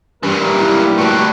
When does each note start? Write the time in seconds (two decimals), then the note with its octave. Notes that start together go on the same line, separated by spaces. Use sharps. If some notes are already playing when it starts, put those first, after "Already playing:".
0.23 G2 A#2 E3 G3 A#4
0.59 D#4 E4 B4
0.98 A2 D3 F#4 B4 D5